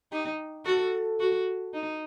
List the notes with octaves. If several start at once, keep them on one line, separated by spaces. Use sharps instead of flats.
D#4 G4
F#4 A4
F#4
D#4